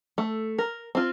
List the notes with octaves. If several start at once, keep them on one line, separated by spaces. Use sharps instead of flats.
A3
A#4
C4 F4